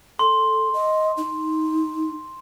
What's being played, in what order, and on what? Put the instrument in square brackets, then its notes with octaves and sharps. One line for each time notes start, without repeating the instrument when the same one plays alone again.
[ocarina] A4 [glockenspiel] C6
[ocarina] D#5
D#4